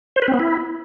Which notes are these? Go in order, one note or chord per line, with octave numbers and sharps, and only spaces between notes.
C5
B4
C4
B3
E4